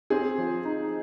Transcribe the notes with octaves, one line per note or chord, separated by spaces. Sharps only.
C4 G#4
F3
D#4